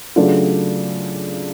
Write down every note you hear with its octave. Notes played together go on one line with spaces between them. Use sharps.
C#3 F#3 A3 D4 F4